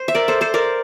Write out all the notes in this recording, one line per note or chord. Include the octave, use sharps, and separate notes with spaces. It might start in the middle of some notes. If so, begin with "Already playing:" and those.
Already playing: C5
E5
A#4 D5
A4 C5
A4 C5
A#4 D5